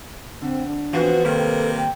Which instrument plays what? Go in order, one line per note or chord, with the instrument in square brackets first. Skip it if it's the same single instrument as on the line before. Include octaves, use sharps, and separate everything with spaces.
[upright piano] D3 [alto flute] C4
[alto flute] D4
[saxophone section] B2 F3 F#4 [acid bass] E3 [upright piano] B3 C4
[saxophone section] C3 G3 A#3 [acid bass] D#3 [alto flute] A4
[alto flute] G5